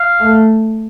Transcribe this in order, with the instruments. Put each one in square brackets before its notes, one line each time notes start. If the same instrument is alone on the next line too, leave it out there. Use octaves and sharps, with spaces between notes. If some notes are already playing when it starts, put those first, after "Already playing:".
Already playing: [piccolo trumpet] F5
[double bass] A3